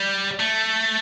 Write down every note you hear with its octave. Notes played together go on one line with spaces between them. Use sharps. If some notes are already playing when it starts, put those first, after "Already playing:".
Already playing: G3
A3